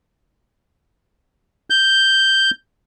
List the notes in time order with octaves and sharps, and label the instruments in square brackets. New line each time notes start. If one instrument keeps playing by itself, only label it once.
[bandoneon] G6